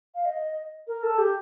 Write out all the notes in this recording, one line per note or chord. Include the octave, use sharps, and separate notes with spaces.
F5
D#5
A#4
A4
G4